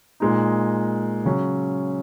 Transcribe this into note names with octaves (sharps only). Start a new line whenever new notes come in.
A#2 G#3 D#4
C#3 F#3 C#4